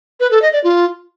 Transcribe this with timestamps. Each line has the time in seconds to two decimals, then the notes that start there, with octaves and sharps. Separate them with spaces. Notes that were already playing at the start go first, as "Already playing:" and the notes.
0.20 B4
0.31 A4
0.42 D#5
0.53 D5
0.64 F4